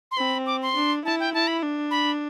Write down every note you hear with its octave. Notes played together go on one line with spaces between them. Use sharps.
C6
C4 B5
D6
C6
D4
E4 A5
G5
E4 A5
B5
D4
B5